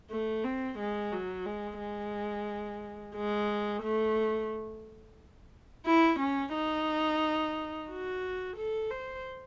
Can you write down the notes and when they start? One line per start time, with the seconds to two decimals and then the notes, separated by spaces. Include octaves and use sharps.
0.11 A3
0.44 C4
0.79 G#3
1.12 F#3
1.46 G#3
1.81 G#3
3.16 G#3
3.83 A3
5.86 E4
6.20 C#4
6.55 D#4
7.90 F#4
8.57 A4
8.91 C5